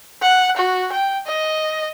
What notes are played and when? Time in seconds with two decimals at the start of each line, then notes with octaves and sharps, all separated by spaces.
0.22 F#5
0.57 F#4
0.92 G5
1.27 D#5